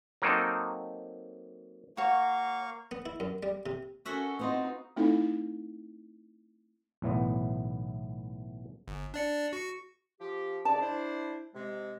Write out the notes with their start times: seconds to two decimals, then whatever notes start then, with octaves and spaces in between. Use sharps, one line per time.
0.22 F#3 A#3 C4 D#4 A4
1.97 A#3 F#4 C#5 F5 C#6
2.91 B3
3.06 E4
3.20 F#2
3.43 G3
3.66 C3
4.05 C#4 F#4 A4 E5 F#5
4.39 B3 C4 D#4 F4 D#5
4.96 A3 C4 D#4 E4 A4
7.02 B1 A2 E3 B3
8.88 G1
9.14 D4 D5 C#7
9.53 F#4 C#7
10.20 F3 G4
10.65 G#2 C#3 D5 A5
10.80 D4 E4 C5
11.54 C3 G#3